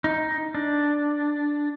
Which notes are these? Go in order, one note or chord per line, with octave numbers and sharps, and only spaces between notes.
D#4
D4